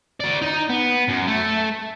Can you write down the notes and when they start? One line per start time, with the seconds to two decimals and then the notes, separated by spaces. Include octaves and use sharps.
0.20 F#4 D5
0.42 D#4
0.70 B3
1.09 F#2
1.28 A3